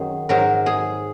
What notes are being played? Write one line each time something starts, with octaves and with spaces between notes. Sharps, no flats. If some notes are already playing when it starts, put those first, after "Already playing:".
Already playing: F#2 D#3 F#3 G#4
G#2 F#3 A#4
G#4